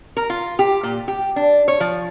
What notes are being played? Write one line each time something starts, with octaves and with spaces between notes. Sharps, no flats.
A#4
F4
G4
A#2
G4
D4
C#5
F3